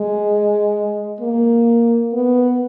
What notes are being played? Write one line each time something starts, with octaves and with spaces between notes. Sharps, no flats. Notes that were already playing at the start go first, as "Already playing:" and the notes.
Already playing: G#3
A#3
B3